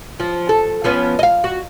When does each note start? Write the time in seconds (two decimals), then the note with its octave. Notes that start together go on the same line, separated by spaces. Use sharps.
0.20 F3
0.49 A4
0.84 F3 B3 C#4
1.19 D#5 F5
1.44 F#4